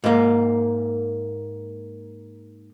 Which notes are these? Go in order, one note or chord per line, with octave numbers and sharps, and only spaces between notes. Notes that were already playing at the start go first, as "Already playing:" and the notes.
G#2 A#3